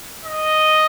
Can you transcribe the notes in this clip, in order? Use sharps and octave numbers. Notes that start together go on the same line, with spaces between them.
D#5